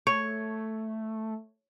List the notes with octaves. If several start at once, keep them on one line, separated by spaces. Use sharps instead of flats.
A3 C#5